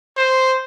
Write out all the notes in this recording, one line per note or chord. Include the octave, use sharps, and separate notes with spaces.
C5